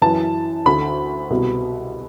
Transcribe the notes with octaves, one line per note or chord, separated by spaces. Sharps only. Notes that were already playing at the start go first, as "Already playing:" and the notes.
F#2 E3 A5
D2 D3 B5
C2 B2